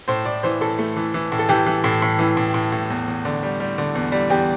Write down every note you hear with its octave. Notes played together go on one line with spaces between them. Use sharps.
A2 C5
A2 D5
E3 C5
A2 A4
A3
E3
E3
A2
A4
E3 G4
E3
A2
A2
E3
A2
A2
A2
E2
E2
D3
G3
G3
D3
E2
G3
E2 G4